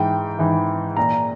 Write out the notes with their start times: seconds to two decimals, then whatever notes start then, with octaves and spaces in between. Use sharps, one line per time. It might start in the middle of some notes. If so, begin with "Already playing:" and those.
Already playing: G#2 E3 G5
0.39 G#2 E3
0.97 A#2 A#5